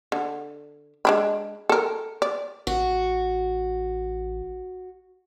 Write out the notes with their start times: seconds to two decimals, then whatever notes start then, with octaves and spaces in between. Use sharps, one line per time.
0.12 D3
1.05 G#3 D4 B5
1.69 A4 A#4
2.22 D5
2.67 A1 F#4